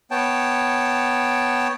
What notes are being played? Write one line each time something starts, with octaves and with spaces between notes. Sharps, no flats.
B3 C#5 G5 A5